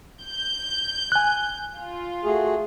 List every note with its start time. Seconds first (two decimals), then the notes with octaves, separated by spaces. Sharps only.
0.24 G6
1.12 G#5 F#6
1.76 F4
2.24 A3 F#4 G#4